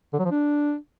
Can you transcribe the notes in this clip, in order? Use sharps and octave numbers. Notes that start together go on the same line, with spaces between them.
D3
F#3
F3
D4